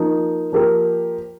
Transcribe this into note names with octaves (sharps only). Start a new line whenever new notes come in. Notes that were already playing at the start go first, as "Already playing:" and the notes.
Already playing: F3 A#3 D#4
F3 A#3 G4 A#4